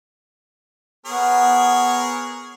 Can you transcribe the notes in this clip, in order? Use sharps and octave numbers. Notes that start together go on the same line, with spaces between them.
B3 G#4 A#4 C#5